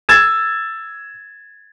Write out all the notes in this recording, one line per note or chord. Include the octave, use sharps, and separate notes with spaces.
E6 G#6 A6 E7